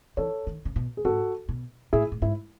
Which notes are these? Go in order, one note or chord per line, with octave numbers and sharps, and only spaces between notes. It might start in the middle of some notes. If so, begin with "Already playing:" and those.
E3 A4 C#5
D#3
C#3
B2
G#4
G#2 F#4 A4
B2
A2 E4 G#4
A2
G#2 E4